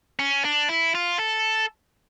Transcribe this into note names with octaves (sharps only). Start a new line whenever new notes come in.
C#4
D4
E4
F4
A4